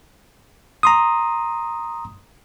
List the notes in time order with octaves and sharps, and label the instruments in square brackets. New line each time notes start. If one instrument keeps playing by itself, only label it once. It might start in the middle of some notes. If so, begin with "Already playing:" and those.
[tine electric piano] A#5 C6 D#6